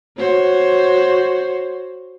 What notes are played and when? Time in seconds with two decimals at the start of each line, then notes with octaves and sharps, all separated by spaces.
0.18 F#4 C5 C#5